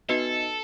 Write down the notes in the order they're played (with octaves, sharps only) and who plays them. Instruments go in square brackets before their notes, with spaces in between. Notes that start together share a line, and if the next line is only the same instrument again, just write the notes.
[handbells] B3 D#4 F#4 B4 D#5 [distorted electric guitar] A4